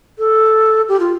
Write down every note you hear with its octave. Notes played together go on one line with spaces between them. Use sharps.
A4
G4
F4